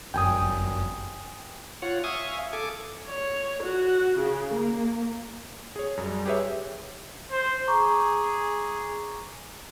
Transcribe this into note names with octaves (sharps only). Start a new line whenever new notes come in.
G1 F#2 G5 G#5 D#6
F4 C#5 F#5
E5 F5 G#5 C#6 D#6
A4 G#5 D6
C#5
F#4
C#3
A#3
G#4 C#5
F#2 G3
G4 G#4 B4 C#5 E5
C5
G#4 A#5 C#6 D6